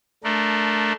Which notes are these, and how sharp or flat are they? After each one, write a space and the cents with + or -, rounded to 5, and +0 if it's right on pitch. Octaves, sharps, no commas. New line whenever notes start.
A3 -10 D4 +0 A#4 +0